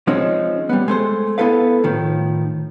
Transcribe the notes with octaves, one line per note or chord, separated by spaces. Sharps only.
F3 G#3 C4 C#4 D#4
G3 B3
G#3 A3 C5
B3 E4 A4 B4 F5
A2 D#3 F3